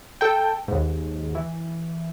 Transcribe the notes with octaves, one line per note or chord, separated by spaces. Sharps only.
A4 G5
D#2 G#2
E3